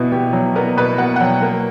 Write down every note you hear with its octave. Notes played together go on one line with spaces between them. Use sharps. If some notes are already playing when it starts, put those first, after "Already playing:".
Already playing: B2 B3 E4
B2 G4
F#3
B3 A#4
B2 B4
B2 F#5
F#5
F#3 G5
A#3